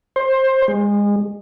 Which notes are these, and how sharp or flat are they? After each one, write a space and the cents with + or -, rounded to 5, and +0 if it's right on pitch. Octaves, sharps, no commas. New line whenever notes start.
C5 +20
G#3 -25